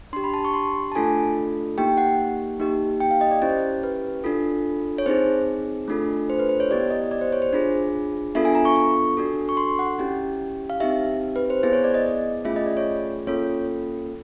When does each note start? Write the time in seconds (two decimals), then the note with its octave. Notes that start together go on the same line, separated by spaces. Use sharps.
0.13 D4 C6
0.16 G4
0.24 B5
0.34 A5
0.45 C#6
0.54 C6
0.92 A5
0.95 A3 D4 F4 A4 G#5
1.78 A#3 D#4 G4 G5
1.97 F#5
2.59 A#3 D#4 G4
3.00 G5
3.11 F5
3.21 D#5
3.31 D5
3.42 C#4 E4 G4 C5
3.83 B4
4.24 D4 F4 A4
4.98 C#5
5.06 C4 D#4 G#4 C5
5.88 A3 D4 F4 A4
6.30 C5
6.39 B4
6.49 C5
6.60 C#5
6.70 B3 E4 G4 D5
6.91 D#5
7.11 D5
7.21 C5
7.33 C#5
7.42 C5
7.53 D4 F4 G#4
8.35 B3 D4 F4 A4 E5
8.45 G#5
8.55 A#5
8.65 C#6
8.76 C#6
9.17 D4 F#4 A4
9.49 C#6
9.57 C6
9.79 F#5
9.99 C#4 E4 G4
10.70 F5
10.80 C4 D#4 G4 E5
11.36 B4
11.50 C5
11.63 B3 E4 G#4 C5
11.73 C#5
11.84 D5
11.94 D#5
12.45 A3 C#4 F4 G#4 E5
12.56 D#5
12.66 D5
12.77 C#5
13.27 A#3 C#4 F4 A4 C#5